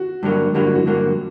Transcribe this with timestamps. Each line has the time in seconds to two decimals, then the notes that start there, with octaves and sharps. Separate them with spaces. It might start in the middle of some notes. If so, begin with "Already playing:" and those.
Already playing: F#4
0.23 G2 D3 F#3 A#3
0.54 G2 D3 F#3 A#3 G4
0.65 F#4
0.75 F#4
0.86 G2 D3 F#3 A#3